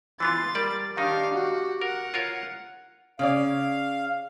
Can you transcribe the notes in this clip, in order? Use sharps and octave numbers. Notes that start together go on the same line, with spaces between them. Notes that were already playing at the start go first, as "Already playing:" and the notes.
E3 B3 F4 C6 A6
G3 A#4 D5
D#3 D4 D#4 G4 F5
F#4
A#4 F#5
F4 A#4 C#5
C#3 C#4 D5 F5